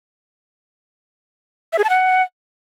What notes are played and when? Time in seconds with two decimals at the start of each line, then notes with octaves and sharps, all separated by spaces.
1.73 E5
1.78 G#4
1.84 A5
1.90 F#5